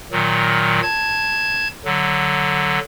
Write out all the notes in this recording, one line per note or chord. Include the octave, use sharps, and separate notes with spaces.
A#2 D#3 F#3
A5 G#6
D3 F#3